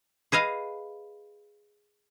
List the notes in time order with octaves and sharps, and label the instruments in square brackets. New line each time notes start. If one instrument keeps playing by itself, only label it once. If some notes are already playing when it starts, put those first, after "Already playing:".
[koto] G#4 B4 D#5 F5